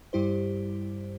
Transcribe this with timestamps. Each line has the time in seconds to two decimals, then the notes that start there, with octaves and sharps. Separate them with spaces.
0.13 G2 G3 E4 G4 C5